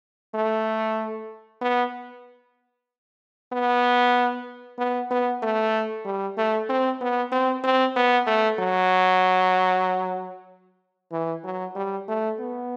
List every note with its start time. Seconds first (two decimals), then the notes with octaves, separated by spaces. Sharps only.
0.34 A3
1.61 B3
3.52 B3
4.78 B3
5.11 B3
5.42 A3
6.05 G3
6.37 A3
6.69 C4
7.01 B3
7.32 C4
7.63 C4
7.96 B3
8.27 A3
8.59 F#3
11.12 E3
11.44 F#3
11.76 G3
12.08 A3
12.39 B3